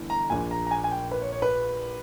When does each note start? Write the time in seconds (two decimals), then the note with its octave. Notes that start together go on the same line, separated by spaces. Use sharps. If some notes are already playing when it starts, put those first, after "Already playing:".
Already playing: G1 E3
0.10 A#5
0.30 A#1 A#2 G#5
0.51 A#5
0.67 A#5
0.71 G#5
0.84 G#5
0.91 G5
1.11 B4
1.22 C#5
1.32 C#5
1.42 B4